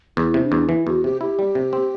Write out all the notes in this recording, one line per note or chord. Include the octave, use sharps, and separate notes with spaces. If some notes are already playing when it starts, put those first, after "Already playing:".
E2 E4
C3
D4
E2
E3 E4
E2 F#4
C3 G4
E4 G4
G3
C3
C4